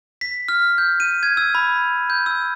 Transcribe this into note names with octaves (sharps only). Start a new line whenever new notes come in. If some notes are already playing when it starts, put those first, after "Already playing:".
B6
F6
G6
D#7
G#6
E6
B5
G6
E6